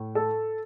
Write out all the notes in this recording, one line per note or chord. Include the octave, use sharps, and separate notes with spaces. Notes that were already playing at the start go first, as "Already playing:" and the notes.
Already playing: A2
A4